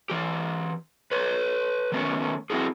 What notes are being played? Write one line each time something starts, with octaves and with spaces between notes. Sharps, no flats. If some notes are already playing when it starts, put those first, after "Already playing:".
E3 G4
B4 C#5
D#3 A3 B3 C#4
C4 E4 F#4 G#4